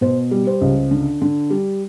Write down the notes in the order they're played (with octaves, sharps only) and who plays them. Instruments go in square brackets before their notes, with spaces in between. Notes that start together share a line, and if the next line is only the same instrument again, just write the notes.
[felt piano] B2 C5
G3
C5
C#2
D3
D3
G3